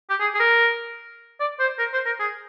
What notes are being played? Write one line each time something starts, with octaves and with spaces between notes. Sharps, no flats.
G4
G#4
G#4
A#4
D5
C5
A#4
C5
A#4
G#4